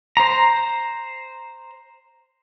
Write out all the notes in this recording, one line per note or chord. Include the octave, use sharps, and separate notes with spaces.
C5 A#5